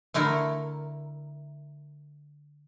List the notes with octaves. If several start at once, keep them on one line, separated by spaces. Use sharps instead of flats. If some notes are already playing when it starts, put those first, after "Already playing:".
D3 A3 E4 A#4